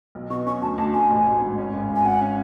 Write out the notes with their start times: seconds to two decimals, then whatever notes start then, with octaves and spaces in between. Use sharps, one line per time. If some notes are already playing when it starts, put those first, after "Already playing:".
0.15 B1
0.30 B2 C#6
0.46 C#4 C#6
0.62 D2 A5
0.78 D2 A5
0.94 D2 G#5
1.10 A1
1.26 A1
1.42 G#2
1.58 C#4
1.73 G#1
1.89 G#1
1.96 G#5
2.05 C#4 F#5
2.22 C#4